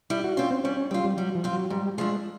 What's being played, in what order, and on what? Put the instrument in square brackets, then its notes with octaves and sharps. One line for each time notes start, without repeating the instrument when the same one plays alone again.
[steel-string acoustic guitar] G3 [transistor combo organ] E4
[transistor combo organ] F#4
[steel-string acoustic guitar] C4 F4 [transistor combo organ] C#4
[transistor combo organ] C4
[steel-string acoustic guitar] G3 [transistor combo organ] C#4
[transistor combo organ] C#4
[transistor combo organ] G3 [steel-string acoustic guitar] C4 F4
[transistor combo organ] G3
[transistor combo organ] F#3 [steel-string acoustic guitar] G3
[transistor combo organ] F3
[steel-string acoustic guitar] C4 F4
[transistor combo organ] F#3
[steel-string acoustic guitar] G#2 [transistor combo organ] G3
[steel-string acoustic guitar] F3 A3 D4 [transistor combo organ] G#3